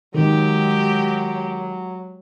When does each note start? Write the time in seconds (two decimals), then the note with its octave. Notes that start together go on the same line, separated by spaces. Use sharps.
0.14 D#3 F#3 G#3 G4